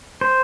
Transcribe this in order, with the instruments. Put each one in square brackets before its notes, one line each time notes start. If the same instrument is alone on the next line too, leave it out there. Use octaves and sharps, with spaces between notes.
[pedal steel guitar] C5